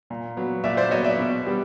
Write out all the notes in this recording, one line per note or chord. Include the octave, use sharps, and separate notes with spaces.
A#2
F#3 B3
A#2 D5 E5
C5 D5
F#3 B3 C#5 D#5
D5 E5
B2
G3 B3